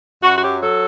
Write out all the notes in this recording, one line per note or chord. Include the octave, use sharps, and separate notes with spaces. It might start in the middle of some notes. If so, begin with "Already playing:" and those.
F#2 F#4
F#4
F#3 G4
F#3 A4